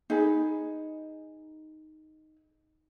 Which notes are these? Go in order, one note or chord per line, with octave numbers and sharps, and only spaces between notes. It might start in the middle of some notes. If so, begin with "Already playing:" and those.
D#4 G#4 B4